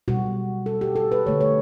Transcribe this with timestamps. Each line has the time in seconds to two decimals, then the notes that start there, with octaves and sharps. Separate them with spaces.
0.08 B2 G3 F#4
0.66 A4
0.81 G4
0.96 A4
1.12 B4
1.26 D3 A3 C#5
1.41 C#5